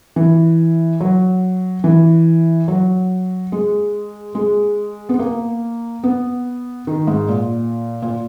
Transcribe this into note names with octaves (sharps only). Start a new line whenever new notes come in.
E3
F#3
E3
F#3
G#3
G#3
B3
A#3
B3
D#3
G#2
A#2
A#2